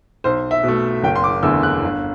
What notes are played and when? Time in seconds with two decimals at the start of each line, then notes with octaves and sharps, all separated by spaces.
0.24 B1 C5
0.51 E5
0.63 B2 A3
1.03 F#1 G5
1.16 C6
1.24 D6
1.43 E2 D3 A3 E6
1.63 F#6
1.83 G1